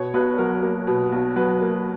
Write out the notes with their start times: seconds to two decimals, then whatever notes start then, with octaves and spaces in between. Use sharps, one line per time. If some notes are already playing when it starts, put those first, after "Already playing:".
Already playing: B2 C#5
0.14 B1 B4
0.38 F#3 A#4
0.62 A#3
0.87 B2
1.12 B1
1.36 F#3 B4
1.61 A#3